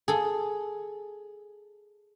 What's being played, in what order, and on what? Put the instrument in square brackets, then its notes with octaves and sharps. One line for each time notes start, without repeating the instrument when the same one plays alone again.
[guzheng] G#4 A4